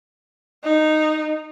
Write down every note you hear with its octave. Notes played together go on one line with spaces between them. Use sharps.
D#4